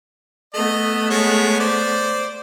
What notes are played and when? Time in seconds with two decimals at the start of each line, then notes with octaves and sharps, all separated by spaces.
0.54 A3 B3 D#5
1.10 G#3 C#5
1.60 C5 D5